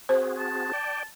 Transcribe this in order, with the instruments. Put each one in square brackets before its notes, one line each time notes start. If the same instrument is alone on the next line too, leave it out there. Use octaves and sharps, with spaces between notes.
[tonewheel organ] C4 F#4 G#4 [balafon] C5
[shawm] A5
[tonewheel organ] D5 G5